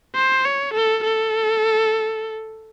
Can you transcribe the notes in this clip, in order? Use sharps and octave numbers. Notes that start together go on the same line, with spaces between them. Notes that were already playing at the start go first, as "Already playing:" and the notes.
C5
C#5
A4
A4